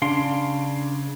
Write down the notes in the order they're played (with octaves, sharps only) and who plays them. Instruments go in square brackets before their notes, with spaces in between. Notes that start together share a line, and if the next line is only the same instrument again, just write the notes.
[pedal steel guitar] C#3 D4 F5 C6